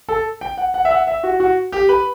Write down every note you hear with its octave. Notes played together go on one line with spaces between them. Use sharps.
A4
G5
F#5
F#5
E5
F#5
E5
F#4
F#4
G4
B4